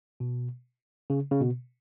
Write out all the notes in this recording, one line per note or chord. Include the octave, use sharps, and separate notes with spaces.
B2
C#3
C#3
B2